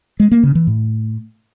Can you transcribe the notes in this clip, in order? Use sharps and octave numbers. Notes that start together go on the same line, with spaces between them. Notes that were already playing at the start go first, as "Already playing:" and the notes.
G#3
A#3
C#3
E3
A2